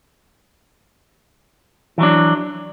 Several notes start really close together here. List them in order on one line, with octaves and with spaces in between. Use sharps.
E3 F#3 D4